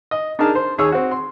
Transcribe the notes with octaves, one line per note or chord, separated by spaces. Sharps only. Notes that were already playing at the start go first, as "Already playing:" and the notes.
D#5
D4 D#4 G#4 A#4 A5
C5
D#2 G#4 C#5 E6
C4 F#4
C6